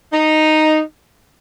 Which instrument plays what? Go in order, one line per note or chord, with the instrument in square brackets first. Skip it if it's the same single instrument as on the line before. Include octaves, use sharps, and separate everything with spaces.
[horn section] D#4